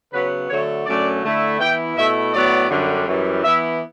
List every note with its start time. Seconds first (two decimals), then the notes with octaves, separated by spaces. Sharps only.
0.12 C#3 F#3 B3 B4
0.48 D3 F#3 A3 C#5
0.85 F#2 D3 F#3 A3 C#4 D5
1.23 D3 A3 E4
1.59 E3 B3 E4 G5
1.96 B2 A3 E4 E5
2.33 A2 F#3 B3 D5
2.70 F#2 D3 G3
3.06 F#2 E3 G3
3.43 E3 B3 E4 E5